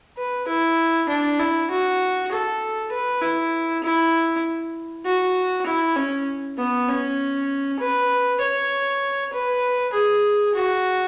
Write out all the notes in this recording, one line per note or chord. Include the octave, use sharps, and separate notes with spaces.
B4
E4
D4
E4
F#4
A4
B4
E4
E4
F#4
E4
C#4
B3
C#4
B4
C#5
B4
G#4
F#4